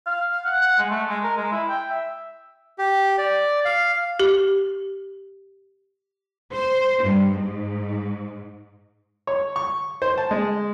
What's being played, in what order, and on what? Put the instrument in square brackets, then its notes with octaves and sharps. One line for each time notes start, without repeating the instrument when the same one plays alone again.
[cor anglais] F5
F5
F#5
F#5
G#3
A3
G#3
A#4
G#3
E4
G5
E5
[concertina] G4
D5
F5
[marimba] G4
[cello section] C5
G2
G#2
[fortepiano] C#5
C#6
C5
A5
G#3